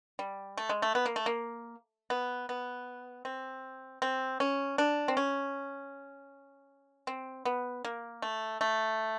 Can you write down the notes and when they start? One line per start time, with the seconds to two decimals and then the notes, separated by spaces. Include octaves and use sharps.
0.19 G3
0.57 A3
0.69 G#3
0.82 A3
0.95 B3
1.06 A#3
1.16 A3
1.26 A#3
2.10 B3
2.49 B3
3.25 C4
4.02 C4
4.40 C#4
4.78 D4
5.08 C4
5.17 C#4
7.07 C4
7.45 B3
7.85 A#3
8.22 A3
8.61 A3